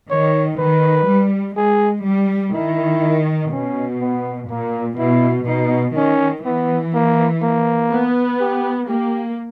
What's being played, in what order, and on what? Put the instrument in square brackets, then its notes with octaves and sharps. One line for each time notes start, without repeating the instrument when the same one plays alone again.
[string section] D#3 [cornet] C#5
[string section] D#3 [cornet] B4
[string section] G3
[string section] G#3 [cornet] G#4
[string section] G3
[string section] D#3 [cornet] E4
[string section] B2 [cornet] C#4
[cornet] B3
[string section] A#2 [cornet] A#3
[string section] B2 [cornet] E4
[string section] B2 [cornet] D#4
[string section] D#3 [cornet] C#4
[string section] E3 [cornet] B3
[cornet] A#3
A#3
[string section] B3
[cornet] G4
[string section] A#3 [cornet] G4